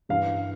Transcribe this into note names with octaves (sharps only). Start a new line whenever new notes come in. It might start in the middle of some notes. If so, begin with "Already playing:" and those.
G2 E3 F5